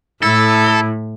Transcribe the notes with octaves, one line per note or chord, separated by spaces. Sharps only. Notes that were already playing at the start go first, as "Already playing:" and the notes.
A2 E4 A4